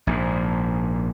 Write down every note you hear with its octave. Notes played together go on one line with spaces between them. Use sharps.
A#1 G#2